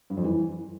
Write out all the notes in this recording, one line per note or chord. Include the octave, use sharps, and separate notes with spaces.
G2
F2
E3